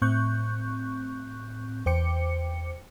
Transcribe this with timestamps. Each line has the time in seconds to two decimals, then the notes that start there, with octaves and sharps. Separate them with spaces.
0.02 A2 C4 C#6 F#6 G6
1.86 E2 C5 G5 D6 C#7